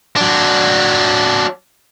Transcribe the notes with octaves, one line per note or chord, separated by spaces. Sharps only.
F#3 D4